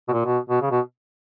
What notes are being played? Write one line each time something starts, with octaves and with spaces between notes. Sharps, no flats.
B2
A#2
B2
B2
C#3
B2